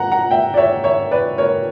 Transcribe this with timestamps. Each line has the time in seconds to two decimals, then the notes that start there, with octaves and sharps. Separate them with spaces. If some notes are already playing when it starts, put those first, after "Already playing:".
Already playing: F#5 A#5
0.12 F#5 A#5
0.31 E5 G5
0.54 D5
0.57 C#5 E5
0.84 C#5 E5
1.11 B4 D5
1.38 A#4 C#5